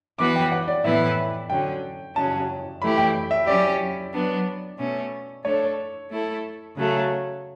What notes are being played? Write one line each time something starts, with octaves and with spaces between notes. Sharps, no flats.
E3 B3 F#4 B4 D6
G5
F#5
D5
A2 E3 B3 E4 B4 E5
D3 F#3 C#4 G5
C#3 F#3 C#4 A5
E3 A3 E4 G4 B5
G5
E5
F#3 C#4 G4 D5
F#3 B3 D4
B2 A3 C#4
A3 D4 A4 C#5
A3 E4 A4
C#3 F#3 A3